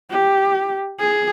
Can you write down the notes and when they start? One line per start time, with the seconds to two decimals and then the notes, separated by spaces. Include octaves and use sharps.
0.10 G4
1.00 G#4